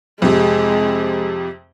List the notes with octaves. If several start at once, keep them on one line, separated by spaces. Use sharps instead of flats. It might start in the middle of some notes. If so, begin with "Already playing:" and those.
F2 C3 G#3